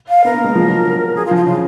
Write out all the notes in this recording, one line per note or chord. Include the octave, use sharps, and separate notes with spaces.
F5
B3 A#4
A#3
G#3
F3
F#3
F3
F#3 G#4
F4
F3
F4
C#3 F4